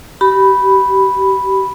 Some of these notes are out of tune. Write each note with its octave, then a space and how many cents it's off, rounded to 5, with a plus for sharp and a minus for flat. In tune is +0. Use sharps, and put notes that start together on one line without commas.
G4 -30 B5 +0